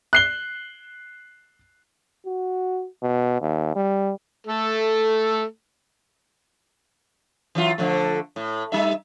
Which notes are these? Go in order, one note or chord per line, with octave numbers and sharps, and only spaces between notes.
F#6 C7 G7
F#4
B2
D#2
G3
A3 A4
E3 F#3 F4
D3 F3 A3
A2
G3 D#4 E5